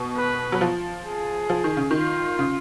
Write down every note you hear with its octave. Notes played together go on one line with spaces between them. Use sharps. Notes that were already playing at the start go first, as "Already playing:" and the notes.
Already playing: B2
B4
F#3
F3
G#4
F3
D#3
C#3
D#3 F4
C#3